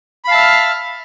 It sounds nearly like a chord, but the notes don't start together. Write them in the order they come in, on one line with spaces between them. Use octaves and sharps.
B5 F5 A5 E5 F6